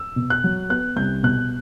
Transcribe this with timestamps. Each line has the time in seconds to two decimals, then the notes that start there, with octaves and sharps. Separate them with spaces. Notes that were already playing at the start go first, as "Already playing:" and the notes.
Already playing: E6
0.16 B2
0.30 F#6
0.44 F#3
0.69 B3 F#6
0.96 C2 G6
1.23 B2 F#6